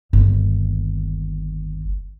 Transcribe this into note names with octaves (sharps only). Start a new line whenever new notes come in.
G1 D#2